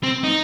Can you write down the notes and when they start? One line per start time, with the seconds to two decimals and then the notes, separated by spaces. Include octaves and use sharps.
0.03 C4
0.24 D#4